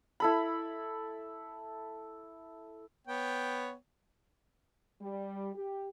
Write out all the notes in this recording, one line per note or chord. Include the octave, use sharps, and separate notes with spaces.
E4 A4 B5
B3 C#5 G5
G3
G4